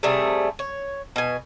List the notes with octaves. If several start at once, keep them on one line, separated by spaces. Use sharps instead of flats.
C3 G3 A3 G#4
C#5
B2 G#5